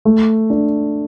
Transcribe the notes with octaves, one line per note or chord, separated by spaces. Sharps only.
A3
D4